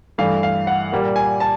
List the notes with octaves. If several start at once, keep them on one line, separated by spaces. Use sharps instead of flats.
G2 E3 A3 F5
F5
F#5
A#2 G3 A#3
G#5
A5